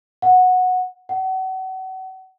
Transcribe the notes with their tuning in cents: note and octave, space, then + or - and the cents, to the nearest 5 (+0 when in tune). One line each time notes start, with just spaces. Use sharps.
F#5 -10
F#5 +35